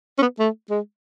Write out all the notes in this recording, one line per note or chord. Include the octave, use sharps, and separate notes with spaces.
C#4
B3
A3
G#3